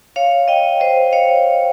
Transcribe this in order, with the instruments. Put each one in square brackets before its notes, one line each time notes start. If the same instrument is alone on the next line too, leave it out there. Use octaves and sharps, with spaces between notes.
[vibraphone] C#5 F5
D#5 G5
C5 D#5
C#5 F5